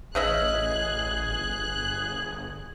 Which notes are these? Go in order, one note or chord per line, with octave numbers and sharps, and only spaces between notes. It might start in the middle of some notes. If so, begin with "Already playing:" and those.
A1 C#3 G#4 D#5 E5 F#6
G1 F#6